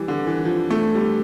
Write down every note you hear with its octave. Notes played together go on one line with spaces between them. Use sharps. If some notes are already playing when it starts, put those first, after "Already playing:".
Already playing: E3 G3
D3
E3
F3
A3
G3